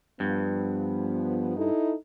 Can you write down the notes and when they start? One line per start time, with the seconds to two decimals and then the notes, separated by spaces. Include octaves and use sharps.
0.20 G2 F3 B3
1.56 D#4 E4 A4